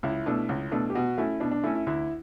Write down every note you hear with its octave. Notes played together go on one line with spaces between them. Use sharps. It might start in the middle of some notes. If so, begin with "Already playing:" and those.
C#2 E4
B2 A3 D4
C#2
B2 A3 D4
G4
B2 F#4
A3 C#4 E4
B2 D4
D4
A3 C#4 E4
E4
D2 E4